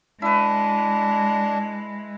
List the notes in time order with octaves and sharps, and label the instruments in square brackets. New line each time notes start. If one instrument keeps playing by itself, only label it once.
[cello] G#3 [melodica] D4 [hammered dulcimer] E4 B4